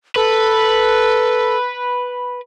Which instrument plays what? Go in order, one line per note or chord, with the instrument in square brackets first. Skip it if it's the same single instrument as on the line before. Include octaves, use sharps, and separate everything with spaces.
[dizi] A4 [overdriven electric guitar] B4